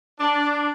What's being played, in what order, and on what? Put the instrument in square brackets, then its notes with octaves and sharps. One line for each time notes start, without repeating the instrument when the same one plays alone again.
[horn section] D4